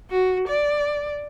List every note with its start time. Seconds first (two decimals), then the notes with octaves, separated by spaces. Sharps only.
0.11 F#4
0.48 D5